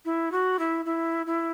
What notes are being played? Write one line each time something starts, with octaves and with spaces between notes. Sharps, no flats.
E4
F#4
E4
E4
E4